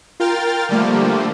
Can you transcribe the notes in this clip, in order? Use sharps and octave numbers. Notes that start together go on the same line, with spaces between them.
F4 A#4 G5 F6 A6
D3 F3 G3 A3 A#3